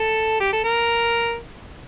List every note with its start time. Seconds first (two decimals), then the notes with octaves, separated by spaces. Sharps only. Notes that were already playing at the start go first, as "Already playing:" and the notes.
Already playing: A4
0.40 G4
0.53 A4
0.64 A#4